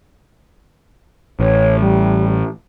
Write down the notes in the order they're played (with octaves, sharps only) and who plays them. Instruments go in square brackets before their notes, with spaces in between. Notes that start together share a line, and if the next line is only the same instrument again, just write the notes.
[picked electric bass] A1 [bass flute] C#5
[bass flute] G3